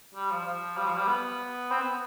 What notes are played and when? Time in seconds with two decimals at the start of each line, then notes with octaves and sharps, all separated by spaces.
0.15 G3
0.31 F3
0.46 F3
0.77 G3
0.87 F3
0.98 G3
1.08 B3
1.71 C4
1.82 B3